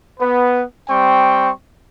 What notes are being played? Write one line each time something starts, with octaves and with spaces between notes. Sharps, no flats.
B3 B4
G3 C4 G5 C#6